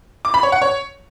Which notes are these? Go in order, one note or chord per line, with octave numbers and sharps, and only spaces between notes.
D6
B5
C#5
F#5
C#5